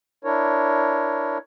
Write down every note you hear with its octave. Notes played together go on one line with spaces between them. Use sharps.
D4 E4 A#4 C#5